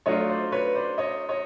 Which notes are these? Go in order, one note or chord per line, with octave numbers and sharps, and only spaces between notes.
F#3 A3 D4 F4 C#5 D#5
C5 D5
B4 C#5
C5 D5
C#5 D#5
C#5 D#5